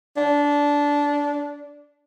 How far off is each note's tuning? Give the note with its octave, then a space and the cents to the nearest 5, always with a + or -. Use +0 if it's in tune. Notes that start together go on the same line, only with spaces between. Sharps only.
D4 -20